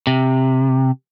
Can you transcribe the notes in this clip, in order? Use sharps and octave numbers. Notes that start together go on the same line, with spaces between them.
C3